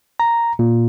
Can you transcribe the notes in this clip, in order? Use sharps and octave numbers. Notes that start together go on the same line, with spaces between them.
A#5
A#2